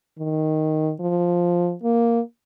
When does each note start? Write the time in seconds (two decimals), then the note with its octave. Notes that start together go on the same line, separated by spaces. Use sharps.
0.18 D#3
1.00 F3
1.84 A#3